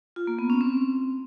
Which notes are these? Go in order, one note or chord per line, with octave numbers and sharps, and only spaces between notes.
F4
A#3
B3
C#4
C4